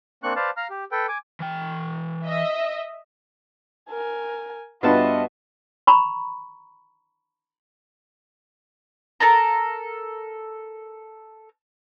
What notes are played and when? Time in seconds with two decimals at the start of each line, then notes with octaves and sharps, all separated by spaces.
0.23 A#3 C4 D4 C#6 F#6
0.36 B4 C5 D5 F5 A5
0.57 F5 A#5 F6
0.70 G4
0.92 A4 B4 G5
1.08 G#5 D6
1.40 E3 G5
2.25 D#5 E5
3.90 A#4 G#5
4.83 G2 B3 F4 F#4 B4 D#5 E5 A5
5.87 A#5 B5 C#6
9.20 A4 A#4 A5 A#5